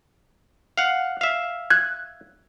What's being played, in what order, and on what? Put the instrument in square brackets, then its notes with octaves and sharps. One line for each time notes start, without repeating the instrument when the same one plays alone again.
[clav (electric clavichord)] F5 F#5
E5 F5
[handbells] F#6 G#6